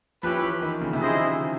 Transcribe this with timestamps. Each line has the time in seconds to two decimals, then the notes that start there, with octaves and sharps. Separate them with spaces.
0.23 F3 C#4 E4 G4 B4
0.42 E3
0.62 D#3
0.81 C#3
0.93 C3
1.01 C#3 E4 G#4 C5 D#5